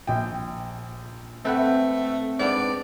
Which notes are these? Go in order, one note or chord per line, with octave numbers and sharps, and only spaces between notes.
A#1 G5
A3 C4 A4 B4 F#5
G#2 B3 D4 D5